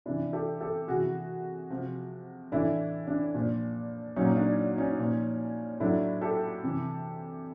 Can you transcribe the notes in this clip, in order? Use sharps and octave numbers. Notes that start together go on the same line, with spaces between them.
C3 E3 D4 E4
G4 A4
G4 A4
C3 E3 F#4 G#4
C3 F3
A2 E3 D4 E4
D4
A#2 F3
A#2 F#3 C#4 D#4
D4
C#4 D#4
A#2 F3
A2 F#3 D4 E4
G4 A4
C3 E3